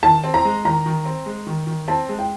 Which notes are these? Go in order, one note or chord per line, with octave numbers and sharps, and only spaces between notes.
D#3 A5
C4
A#5
G#3
D#3 A#5
D#3
C4
G#3
D#3
D#3
C4 A5
G#3
G5